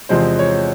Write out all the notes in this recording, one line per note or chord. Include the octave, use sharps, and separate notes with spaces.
E2 C3 F3 G#3 C5
C#5